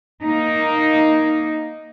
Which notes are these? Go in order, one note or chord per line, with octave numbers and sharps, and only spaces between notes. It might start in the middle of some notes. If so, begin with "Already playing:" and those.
A#3 D#4